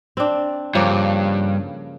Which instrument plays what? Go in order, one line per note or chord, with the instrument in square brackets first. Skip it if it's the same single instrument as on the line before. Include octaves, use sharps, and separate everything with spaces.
[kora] C4 D4
[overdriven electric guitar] G2 [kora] C#3 F3 A#3